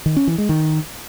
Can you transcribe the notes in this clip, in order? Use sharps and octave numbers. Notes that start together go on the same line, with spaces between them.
D#3
C#4
E3
G#3
D#3